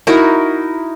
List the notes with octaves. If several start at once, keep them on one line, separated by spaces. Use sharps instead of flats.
D#4 E4 F#4 A#4